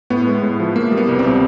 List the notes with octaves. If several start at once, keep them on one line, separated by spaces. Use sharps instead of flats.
A2 B3
G#3
A2
F3
A#3
G3
B3
C2
C4
B2